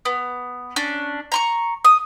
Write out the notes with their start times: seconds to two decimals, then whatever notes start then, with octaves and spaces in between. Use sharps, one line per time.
0.05 B3
0.76 C#4 D4
1.32 A#5 C6 C#6
1.85 D#6